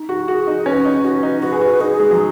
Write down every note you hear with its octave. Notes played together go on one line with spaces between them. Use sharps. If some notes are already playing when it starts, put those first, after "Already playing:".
Already playing: D#4
F#4
F#4 G#4
D#4
C#4 B4
D#4
F#4
D#4
F#4 B4
G#4
F#4
D#4 G#4
G#3
F#3